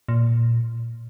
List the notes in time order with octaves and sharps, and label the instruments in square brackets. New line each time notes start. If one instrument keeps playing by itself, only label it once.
[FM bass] A#2